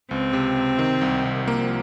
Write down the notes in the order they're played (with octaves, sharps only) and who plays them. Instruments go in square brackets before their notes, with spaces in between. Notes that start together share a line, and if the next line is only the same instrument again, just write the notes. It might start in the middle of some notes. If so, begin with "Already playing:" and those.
[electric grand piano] C#2 [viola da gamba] C4
[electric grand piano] C3
C3
D#3
C2
C2
[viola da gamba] F3 [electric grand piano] A#3